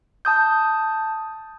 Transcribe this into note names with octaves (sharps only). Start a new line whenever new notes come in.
A5 D#6 G6